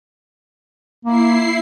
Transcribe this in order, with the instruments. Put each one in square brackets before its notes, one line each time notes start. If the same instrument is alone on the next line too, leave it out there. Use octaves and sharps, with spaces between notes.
[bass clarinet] A#3 [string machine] E4 C7